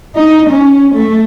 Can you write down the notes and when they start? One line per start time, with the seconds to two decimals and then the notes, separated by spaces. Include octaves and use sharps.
0.16 D#4
0.50 C#4
0.94 A3